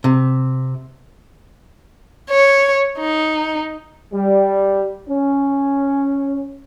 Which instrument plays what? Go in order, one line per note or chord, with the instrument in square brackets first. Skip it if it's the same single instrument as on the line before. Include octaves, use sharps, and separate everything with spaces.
[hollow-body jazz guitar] C3
[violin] C#5
D#4
[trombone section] G3
C#4